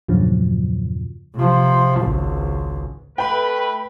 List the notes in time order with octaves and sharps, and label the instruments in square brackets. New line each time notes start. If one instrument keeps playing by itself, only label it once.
[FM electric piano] E2 G2 A#2 C#3 F3 F#3
[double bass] C3 F3
G#1 C#2
[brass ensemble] A3 B4 [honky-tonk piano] G5 B5